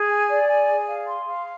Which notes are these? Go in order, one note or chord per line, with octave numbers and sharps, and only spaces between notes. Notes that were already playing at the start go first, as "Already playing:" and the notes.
Already playing: G#4
G#5
D5
G#5
G#4
F5
C6
F5